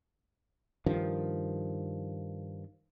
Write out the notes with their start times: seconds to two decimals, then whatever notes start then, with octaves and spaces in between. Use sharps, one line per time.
0.86 G2 D#3 F3